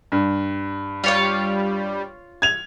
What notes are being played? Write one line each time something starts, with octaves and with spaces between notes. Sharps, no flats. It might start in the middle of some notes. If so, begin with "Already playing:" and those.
G2
G3 F4 C#5 F5
G#6 F7